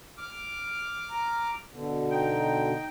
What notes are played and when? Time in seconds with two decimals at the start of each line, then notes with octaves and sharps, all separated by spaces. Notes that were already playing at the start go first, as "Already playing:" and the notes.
0.18 D6 F6
1.10 A#5
1.71 B2 D3
2.11 D#4 G5